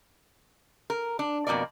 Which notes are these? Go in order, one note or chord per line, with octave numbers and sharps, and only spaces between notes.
A#4
D4
F2 B2 A#3 A#4 D5